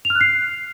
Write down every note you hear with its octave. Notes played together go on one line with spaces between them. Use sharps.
F7
F6
F#6
C7